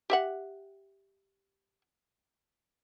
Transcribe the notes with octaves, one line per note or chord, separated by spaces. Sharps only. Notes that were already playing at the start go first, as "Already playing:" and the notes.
G4 E5 F#5